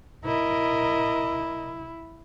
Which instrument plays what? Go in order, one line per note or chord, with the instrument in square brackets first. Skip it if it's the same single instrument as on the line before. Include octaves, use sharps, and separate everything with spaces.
[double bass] E4 [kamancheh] A#4 D#5